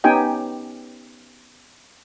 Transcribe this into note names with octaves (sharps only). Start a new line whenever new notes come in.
B3 C#4 D#4 G4 G5 G#5